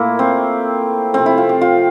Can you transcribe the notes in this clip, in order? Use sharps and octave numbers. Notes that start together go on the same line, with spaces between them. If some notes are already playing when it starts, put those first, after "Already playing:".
Already playing: A#2 A3 A#3 E4
C4
C3 F3 A3 C4
E4
F4
G4
F4